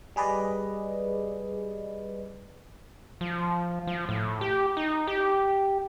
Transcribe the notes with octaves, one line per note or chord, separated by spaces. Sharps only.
G3 G#4 B4 D5 D#5
F3
F3
A2
G4
D#4
G4